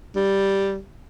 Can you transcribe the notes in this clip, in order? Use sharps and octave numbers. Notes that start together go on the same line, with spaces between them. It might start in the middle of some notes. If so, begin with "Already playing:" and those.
G3